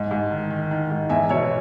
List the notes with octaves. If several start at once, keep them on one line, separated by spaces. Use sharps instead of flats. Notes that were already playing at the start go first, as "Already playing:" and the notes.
Already playing: G#2
G#2
D#3
D#3
D#3
G#2
E2 E5 G#5
B2 C#5 E5